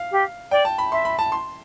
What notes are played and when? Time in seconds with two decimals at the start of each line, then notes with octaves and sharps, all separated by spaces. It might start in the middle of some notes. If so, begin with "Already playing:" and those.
Already playing: F5
0.11 G4
0.51 D5 G5
0.65 A5
0.78 B5
0.92 E5 C6
1.05 B5
1.19 A5
1.32 C6